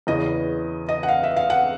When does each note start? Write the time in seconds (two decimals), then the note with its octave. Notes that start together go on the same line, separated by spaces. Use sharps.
0.07 E2 C#3 E3 D#5
0.89 D#5
1.03 F#5
1.08 F5
1.23 E5
1.37 F5
1.50 F#5